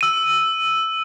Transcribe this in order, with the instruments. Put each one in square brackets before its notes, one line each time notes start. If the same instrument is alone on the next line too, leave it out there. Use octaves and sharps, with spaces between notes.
[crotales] E6 D#7